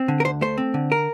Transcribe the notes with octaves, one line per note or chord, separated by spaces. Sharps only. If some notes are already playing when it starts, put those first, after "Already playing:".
Already playing: C4
D3
A#4
D2 C5
A3 C5
C4
D3
A#4